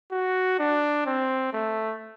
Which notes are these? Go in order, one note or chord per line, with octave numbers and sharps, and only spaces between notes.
F#4
D4
C4
A3